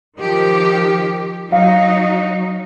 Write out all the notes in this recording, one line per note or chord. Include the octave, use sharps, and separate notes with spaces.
D#3 F3 G4
F#3 D#4 F5